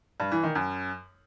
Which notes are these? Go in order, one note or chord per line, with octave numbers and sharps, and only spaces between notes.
G2
E3
D#3
F#2